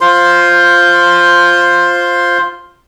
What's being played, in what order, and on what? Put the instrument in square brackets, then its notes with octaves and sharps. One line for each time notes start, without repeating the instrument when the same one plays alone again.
[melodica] F4 C5 C6